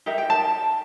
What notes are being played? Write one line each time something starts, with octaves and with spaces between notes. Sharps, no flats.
D#4 G4 A#4 E5
G5
A5